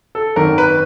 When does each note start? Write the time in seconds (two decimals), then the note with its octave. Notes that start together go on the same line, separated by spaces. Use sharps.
0.15 A4
0.36 G#1 F#2 D#3 A#4
0.58 B4